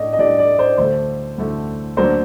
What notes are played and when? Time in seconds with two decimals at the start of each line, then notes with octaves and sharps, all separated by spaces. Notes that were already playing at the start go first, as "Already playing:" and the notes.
Already playing: A2 D4 D5 D#5
0.13 D#5
0.19 A2 G3 D4 D5
0.38 D5
0.59 C5
0.78 D2 D3 A3 C5
1.38 D2 D3 A3
1.97 D2 D3 F#3 A#3 D4 C5